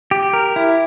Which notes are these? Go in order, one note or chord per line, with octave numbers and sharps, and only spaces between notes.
G4
A#4
E4